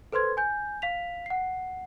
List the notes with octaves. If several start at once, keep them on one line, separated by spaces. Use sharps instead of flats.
A4 B4 C5 C6 G#6
G#5 G6
F5 B6 F7
F#5 C7